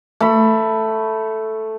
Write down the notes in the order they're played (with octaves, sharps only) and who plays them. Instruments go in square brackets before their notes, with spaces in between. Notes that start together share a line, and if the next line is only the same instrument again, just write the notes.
[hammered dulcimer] A3 B5